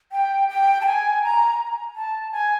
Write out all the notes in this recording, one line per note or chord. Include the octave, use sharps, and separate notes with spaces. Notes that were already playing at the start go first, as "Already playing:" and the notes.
G5
G5
A5
G#5
A#5
A5
G#5